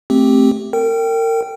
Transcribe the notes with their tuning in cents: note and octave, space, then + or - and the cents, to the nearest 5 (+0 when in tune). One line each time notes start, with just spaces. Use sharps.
A3 +0 C4 +0 G4 +0
A#4 -35 G5 -10